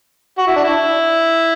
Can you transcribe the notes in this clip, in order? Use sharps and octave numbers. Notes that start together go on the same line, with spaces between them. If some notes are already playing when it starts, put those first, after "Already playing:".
F#4
E4
D4
E4